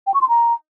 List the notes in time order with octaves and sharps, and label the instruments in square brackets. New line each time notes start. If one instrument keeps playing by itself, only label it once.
[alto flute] G5
C#6
C6
A#5